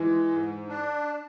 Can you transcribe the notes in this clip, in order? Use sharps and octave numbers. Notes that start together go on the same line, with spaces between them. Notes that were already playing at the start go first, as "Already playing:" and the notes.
Already playing: E3 G#3
G#2
D4